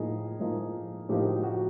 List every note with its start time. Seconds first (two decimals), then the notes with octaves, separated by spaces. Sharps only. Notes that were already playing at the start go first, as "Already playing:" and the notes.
Already playing: A2 F3 A#3 D#4 G#4
0.40 A2 F3 A#3 D#4
1.09 A2 F3 A#3 D#4 G4
1.26 F#4
1.43 F#4